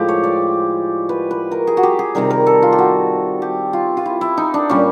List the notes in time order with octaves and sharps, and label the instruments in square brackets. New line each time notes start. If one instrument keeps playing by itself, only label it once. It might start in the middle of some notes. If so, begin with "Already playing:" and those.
Already playing: [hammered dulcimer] A2 F3 G#3 G4
C#5
D5
B4
B4
A#4
G#4
F#4
G4
G#4
C3 D#3 G3 A#4
A#4
A4
F4
G4
F#4
G4
F4
F4
E4
E4
D#4
D4
A#2 G3 C#4